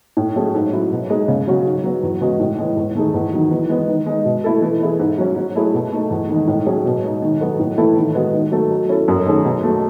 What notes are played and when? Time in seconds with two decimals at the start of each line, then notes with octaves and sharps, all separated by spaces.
0.17 A2
0.36 F#3 A3 C#4 G#4
0.54 G#2
0.73 F#3 C#4 E4
0.91 B2
1.10 G#3 D#4 G#4
1.28 C#3
1.47 F#3 C#4 F#4
1.65 G#2
1.84 F#3 B3
2.03 E2
2.21 C#3 G#3 B3 F#4
2.40 A2
2.58 E3 G#3
2.77 E2
2.95 D#3 A3 D#4 G#4
3.14 E2
3.33 D#3 F#3
3.51 E3
3.69 G#3 B3
3.88 D#3
4.06 G#3 D#4
4.25 B2
4.44 A3 E4 A4
4.62 E3
4.81 B3 E4 G#4
4.99 G#2
5.18 F#3 C#4
5.36 F#3
5.55 A3 E4 G#4
5.74 B2
5.92 A3 D#4 A4
6.11 E2
6.29 D#3 G#3
6.47 A2
6.66 F#3 C#4 G#4
6.85 B2
7.04 G#3 D#4
7.22 D#3
7.41 F#3 B3 F#4 A4
7.59 A2
7.77 E3 A3 E4 A4
7.96 D#3
8.15 G#3 B3 F#4
8.34 D#3
8.52 F#3 A3 D#4 A4
8.70 F#3
8.89 C#4 E4 A4
9.08 F#2
9.26 D#3 A3 C#4 G#4
9.45 B2
9.63 F#3 A3